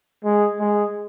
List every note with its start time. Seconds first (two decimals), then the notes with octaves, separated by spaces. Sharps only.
0.24 G#3
0.60 G#3